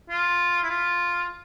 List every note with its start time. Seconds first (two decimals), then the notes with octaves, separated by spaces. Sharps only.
0.10 F4
0.63 E4
0.70 F4